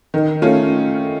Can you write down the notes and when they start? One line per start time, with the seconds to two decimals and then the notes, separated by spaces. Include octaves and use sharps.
0.14 D#3
0.42 A3 C#4 F4